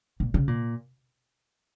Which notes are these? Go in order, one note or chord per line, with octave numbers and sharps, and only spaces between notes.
A#2
C#3
A#2